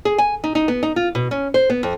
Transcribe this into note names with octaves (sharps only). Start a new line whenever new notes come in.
G#4
G#5
D#4
D#4
B3
D#4
F4
B2
C#4
C5
B3
F2